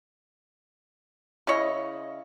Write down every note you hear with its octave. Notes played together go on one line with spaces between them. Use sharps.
C#3 E4 C#5 D#5